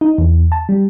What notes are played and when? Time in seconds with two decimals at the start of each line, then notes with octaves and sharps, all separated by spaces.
0.01 D#4
0.18 E2
0.52 A5
0.69 G3